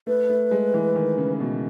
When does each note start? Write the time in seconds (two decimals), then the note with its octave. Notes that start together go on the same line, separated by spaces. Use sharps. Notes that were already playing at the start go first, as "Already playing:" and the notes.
0.07 A3 B4
0.29 A3
0.51 G#3
0.74 E3
0.96 D#3
1.18 C#3
1.40 B2